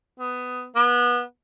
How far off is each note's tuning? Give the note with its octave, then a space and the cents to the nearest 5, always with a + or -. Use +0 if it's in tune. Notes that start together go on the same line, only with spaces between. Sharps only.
B3 +15
B3 -25